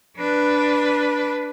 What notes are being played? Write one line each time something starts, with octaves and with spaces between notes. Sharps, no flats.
D4 B4